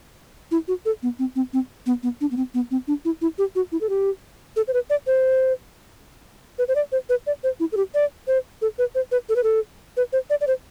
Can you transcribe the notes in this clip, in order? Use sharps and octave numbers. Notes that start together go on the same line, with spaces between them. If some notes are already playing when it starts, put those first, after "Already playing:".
E4
F#4
A4
B3
C4
C4
C4
B3
B3
D4
B3
C4
B3
C4
D4
E4
E4
G4
F#4
E4
A4
G4
A4
C5
B4
D5
C5
B4
C5
D5
C5
B4
D5
C5
E4
A4
G4
D5
C5
A4
B4
C5
B4
A4
B4
A4
B4
C5
D5
D5
C5